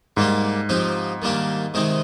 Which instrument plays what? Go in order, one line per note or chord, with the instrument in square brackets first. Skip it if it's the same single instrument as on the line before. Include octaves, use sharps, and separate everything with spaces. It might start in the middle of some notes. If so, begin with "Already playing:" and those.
[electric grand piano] G#2 [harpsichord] G3 A#3 D4 G4
[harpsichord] F3 C4 D#4 G4
D#3 G3 A#3 D4 G4
C3 D#3 G#3 C4 D#4